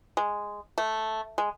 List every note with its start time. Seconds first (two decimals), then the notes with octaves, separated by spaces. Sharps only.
0.17 G#3
0.78 A3
1.38 G#3